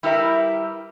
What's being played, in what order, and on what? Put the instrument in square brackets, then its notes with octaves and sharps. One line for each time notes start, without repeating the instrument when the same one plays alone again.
[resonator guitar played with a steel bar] G3 E4 G4 A#4 B4 E5